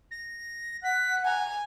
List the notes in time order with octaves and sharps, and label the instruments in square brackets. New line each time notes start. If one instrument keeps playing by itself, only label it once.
[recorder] A#6
[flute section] F#5 F#6 [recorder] B6
[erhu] G#5 [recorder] A#5